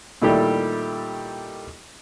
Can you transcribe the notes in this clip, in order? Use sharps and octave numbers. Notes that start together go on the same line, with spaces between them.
A#2 D#3 G3 A3 E4 G4